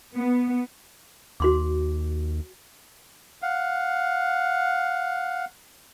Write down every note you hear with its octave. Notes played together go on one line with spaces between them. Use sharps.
B3
D#2 F#4 C6 D6
F5 F#5